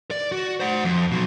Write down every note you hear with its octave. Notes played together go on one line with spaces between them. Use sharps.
D5
F#4
C5 F#5
F2
B2 F#3